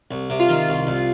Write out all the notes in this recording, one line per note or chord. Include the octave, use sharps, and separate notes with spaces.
C2
C3
F4
D#3
C2
C2